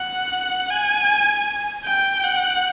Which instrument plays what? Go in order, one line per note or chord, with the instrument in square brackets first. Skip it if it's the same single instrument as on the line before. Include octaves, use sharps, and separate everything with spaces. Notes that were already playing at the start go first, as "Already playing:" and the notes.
Already playing: [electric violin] F#5
G#5
G5
F#5